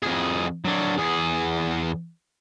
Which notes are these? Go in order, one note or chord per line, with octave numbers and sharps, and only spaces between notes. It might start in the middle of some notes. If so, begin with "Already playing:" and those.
F2 G#4
F#3 D4
E2 G#4